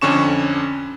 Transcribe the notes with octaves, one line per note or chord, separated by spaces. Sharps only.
F2 D3 C#4 C#6 E7